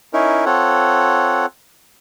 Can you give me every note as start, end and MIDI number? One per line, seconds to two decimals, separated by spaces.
0.13 0.45 61
0.13 0.45 63
0.13 0.45 64
0.13 0.45 70
0.46 1.46 60
0.46 1.46 65
0.46 1.46 69
0.46 1.46 73
0.46 1.46 78